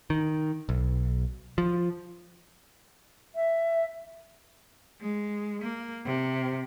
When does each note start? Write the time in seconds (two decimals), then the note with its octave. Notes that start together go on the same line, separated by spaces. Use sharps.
0.10 D#3
0.69 B1
1.58 F3
3.35 E5
5.01 G#3
5.62 A#3
6.05 C3